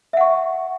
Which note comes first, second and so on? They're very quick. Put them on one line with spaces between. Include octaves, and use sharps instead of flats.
E5 F#5 C#6